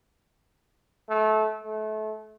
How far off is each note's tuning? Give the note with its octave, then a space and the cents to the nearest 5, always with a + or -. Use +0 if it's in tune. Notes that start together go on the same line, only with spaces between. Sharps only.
A3 -25
A3 -30